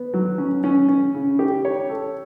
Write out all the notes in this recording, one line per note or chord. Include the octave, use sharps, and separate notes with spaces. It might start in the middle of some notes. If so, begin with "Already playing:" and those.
Already playing: B3
F#3
C#4
C#4
C#4
C#3
G4
C#5
A4